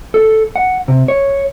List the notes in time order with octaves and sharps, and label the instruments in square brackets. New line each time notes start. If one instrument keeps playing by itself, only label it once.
[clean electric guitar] A4
F#5
C3
C#5